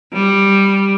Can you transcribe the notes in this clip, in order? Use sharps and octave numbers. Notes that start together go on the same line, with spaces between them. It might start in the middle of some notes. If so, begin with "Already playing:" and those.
G3